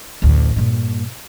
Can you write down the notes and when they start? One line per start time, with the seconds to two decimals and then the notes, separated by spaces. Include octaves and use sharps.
0.22 A1 D2
0.56 G2 A#2